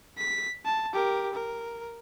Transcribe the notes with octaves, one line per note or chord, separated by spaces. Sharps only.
B6
A5
G4 A#4
A#4